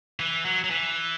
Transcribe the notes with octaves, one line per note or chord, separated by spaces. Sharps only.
E3
F#3
F#3
E3